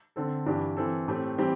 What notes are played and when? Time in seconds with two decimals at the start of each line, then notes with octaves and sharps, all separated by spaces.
0.16 D3 C4 A4
0.46 G2 E3 G3 D4 G4
0.77 E3 C4 A4
1.08 A2 A3 C4 G4
1.38 E3 G3 C4 G4